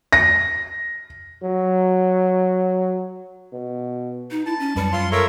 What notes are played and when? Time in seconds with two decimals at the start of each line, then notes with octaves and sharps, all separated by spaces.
0.13 A#6
1.43 F#3
3.53 B2
4.31 D#4
4.46 E4 A5
4.59 C#4
4.76 F#2 G3 B4 C#7
4.92 F#3 F4 C6
5.12 A4 A#4 C#5 E5 A#5